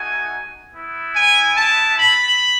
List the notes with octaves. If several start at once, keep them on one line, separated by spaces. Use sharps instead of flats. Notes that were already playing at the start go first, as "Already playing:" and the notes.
Already playing: A3 D#4 F#4 G#5
B3 E4
G#5
A5
B5